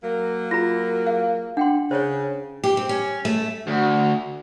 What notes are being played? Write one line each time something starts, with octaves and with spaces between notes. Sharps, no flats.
F#3 A#3
F4 G#4 A#5 A#6
G#4 F5
D4 F#5 G5 C6
C#3 C5 C#5
G4
C4
C#4
A3
D2 F#4